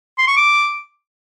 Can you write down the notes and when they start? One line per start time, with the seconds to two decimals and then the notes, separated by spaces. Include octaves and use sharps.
0.18 C6
0.27 C#6
0.37 D6